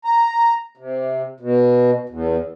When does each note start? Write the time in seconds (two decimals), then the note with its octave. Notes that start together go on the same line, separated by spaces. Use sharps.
0.05 A#5
0.77 C3
1.40 B2
2.09 E2